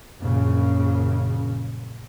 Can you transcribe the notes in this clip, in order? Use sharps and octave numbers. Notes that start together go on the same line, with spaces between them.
A#1 F#2 C#3